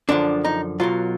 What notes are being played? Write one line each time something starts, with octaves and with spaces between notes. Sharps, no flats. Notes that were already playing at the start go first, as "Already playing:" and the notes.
F#2 D3 F3 D4
D#4
B1 B2 F#3 F4